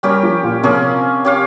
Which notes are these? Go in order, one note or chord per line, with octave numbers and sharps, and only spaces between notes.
G3 C#4 G4 A#4 C#5
F3
A#2
C3 F3 A#3 C#4 G#4
C#4 G4 C#5 F5